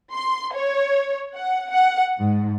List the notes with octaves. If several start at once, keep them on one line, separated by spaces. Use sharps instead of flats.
C6
C#5
F#5
F#5
G#2